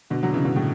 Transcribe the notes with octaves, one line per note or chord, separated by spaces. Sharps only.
B2 D3
D3 F#3
C#3 E3
B2 D3
A2 C#3